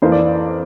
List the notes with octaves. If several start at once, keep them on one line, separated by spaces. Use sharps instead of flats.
F2 E3 A#3 C5
D5